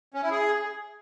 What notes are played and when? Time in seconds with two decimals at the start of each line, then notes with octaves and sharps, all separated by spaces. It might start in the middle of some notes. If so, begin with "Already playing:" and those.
0.14 C#4
0.22 E4
0.30 G#4